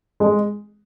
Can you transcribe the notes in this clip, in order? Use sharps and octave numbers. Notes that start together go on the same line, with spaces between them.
G#3